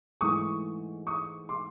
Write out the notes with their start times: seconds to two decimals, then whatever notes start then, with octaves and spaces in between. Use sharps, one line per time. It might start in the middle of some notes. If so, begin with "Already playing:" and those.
0.21 G#2 E3 A3 C#6 D#6
1.07 C#6 D#6
1.49 C6 D6